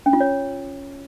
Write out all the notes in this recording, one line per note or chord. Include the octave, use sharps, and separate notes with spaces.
C#4
F4
C#5